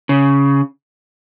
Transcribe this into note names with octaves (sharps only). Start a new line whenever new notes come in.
C#3